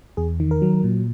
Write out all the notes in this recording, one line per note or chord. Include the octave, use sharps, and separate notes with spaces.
E2 G#4
D#3
A#4
F#3
A#2